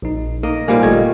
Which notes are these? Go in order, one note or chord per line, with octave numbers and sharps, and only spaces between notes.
A#1 D#4
A#3 D#4 D#5
A#2 G3 A#3 C5 F5 G#5
G1 A3 D#5 G#6